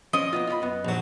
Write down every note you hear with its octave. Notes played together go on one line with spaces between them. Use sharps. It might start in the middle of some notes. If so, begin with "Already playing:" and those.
F3 C#4 D5 D#5
A#3 B3 F4
F4 D5 B5
F#2 B3
A#1 F#3